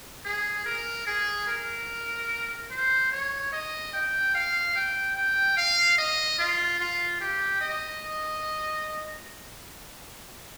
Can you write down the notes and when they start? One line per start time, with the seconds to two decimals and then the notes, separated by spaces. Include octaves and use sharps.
0.25 G#4
0.66 A#4
1.07 G#4
1.48 A#4
2.71 C5
3.12 C#5
3.53 D#5
3.94 G5
4.34 F5
4.76 G5
5.16 G5
5.57 F5
5.98 D#5
6.39 F4
6.80 F4
7.21 G4
7.61 D#5